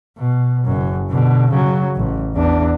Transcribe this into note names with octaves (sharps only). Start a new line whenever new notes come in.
B2
F#1 F#2
B2 D3
C#3 F#3
A1
E2 D4